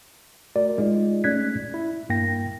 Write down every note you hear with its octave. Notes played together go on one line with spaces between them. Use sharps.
A3 F#4 A#4 D5
G#3 D#4 F4
A3 C#4 D5 F#6 G#6 B6
E4
G2 A#3 G5 A#6